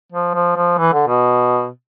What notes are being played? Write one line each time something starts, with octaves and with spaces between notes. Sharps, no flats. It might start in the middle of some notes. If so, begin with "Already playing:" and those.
F3
F3
F3
E3
D3
B2